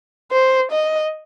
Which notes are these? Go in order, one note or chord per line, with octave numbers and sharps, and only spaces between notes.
C5
D#5